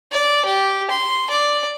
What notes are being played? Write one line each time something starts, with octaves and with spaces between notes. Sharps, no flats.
D5
G4
C6
D5